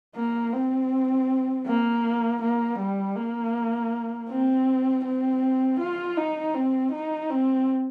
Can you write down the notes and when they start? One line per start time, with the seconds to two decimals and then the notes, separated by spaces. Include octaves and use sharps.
0.16 A#3
0.53 C4
1.66 A#3
2.42 A#3
2.79 G3
3.16 A#3
4.29 C4
5.05 C4
5.80 F4
6.17 D#4
6.55 C4
6.92 D#4
7.30 C4